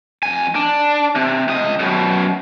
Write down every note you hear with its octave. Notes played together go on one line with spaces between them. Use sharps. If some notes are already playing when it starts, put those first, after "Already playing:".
F2 G#5
D4
C3
C#2 D#5
F#2 B2